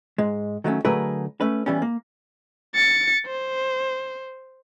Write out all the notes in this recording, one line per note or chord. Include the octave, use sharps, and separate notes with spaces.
G#2 G#3
D#3 F#3 A3 C#4
D3 F#3 A3 G#4 A#4 B4
A3 C#4 B4
E3 G3 B3 C#4
A#3
A6 C#7
C5